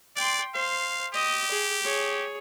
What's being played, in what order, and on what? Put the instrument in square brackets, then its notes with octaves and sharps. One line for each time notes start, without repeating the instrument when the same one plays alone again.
[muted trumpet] D5 [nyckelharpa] G5 C6
[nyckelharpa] C5 [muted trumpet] F5
[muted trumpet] G4 [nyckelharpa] D#5
[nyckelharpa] G#4
G#4 C#5